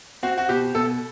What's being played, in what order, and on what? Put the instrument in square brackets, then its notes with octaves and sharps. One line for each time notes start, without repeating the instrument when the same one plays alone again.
[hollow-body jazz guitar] C4 [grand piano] F#4
[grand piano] F#4
[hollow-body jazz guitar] B2 [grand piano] G4
[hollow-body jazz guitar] B2 [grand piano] A4